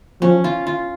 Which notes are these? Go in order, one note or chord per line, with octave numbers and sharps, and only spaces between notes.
F3 C#4
F4
F4